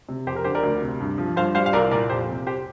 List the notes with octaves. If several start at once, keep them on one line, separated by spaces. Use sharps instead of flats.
C3
F2 G4 C5
A#4
D3 G4 C5
A#4 D5
D2
C3
G2
F3
G2 C5 F5
G3 C5 F5
F5
C2 A#4 D5
A#2 A#4 D5
F2 G4 C5
C3
G4 C5